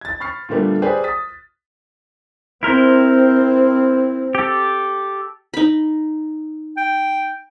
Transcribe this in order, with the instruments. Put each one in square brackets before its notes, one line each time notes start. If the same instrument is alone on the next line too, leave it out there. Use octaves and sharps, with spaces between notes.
[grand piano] G#6 A6
B5 C#6 F6 A6 C7
A#2 D3 G3 A3 B3
G4 G#4 B4 C5 D5
D#6 A6 B6
[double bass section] C4 [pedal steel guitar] E4 A#4 C5
[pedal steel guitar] G4 A4
[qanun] D#4 B5
[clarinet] G5